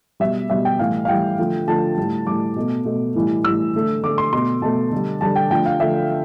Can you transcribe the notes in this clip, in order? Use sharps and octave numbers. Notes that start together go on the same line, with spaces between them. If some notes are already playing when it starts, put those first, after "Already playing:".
B2 G3 E5
B2 G3 E5
G5
A2 E3 G3 F5
F5
A2 E3 G3 G5
D3 F3 A3
D3 F3 A3 A5
A2 G3
A2 G3 D6
B2 A3
B2 A3
A2 E3 G3
A2 E3 G3 E6
D3 A3
D3 A3 D6
C6
B2 A3 C6
B2 A3 A5
D3 G3
D3 G3 A5
G5
D3 F3 A3 G5
F5
D3 F3 A3 E5